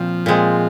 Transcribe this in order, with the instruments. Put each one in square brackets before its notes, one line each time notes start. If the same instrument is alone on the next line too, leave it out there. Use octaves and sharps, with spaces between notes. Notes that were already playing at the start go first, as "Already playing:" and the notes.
Already playing: [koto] A#2 C4 [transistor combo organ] F3
[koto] A#2 G#3 C4